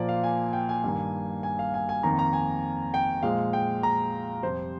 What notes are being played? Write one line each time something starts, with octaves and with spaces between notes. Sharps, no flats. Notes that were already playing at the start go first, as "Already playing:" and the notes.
Already playing: A#2 F3 A#3 D5
F5
G#5
G5
G#5
G2 D#3 A#3
G#5
F5
G#5
G#5
F2 D#3 A#3 A#5
A#5
G#5
G5
A#2 F3 G#3 F5
G5
A#5
F2 C3 G3 C5